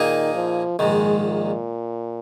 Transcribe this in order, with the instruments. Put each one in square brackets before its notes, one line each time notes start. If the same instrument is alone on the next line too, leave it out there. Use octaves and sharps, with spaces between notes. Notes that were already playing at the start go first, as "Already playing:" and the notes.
Already playing: [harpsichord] A#2 A#3 D#4 G#4 D#5 [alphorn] D#3
[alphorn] F3
[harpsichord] A#1 G#2 D#3 [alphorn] G#3
[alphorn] A#2